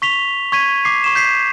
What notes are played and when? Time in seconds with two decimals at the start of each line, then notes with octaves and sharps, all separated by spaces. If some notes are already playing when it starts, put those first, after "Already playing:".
0.02 C#6 B6 F7 G7
0.52 C#6 G#6 B6 D#7
0.85 D6 C7
1.04 C#6 E7
1.15 G6 B6 C7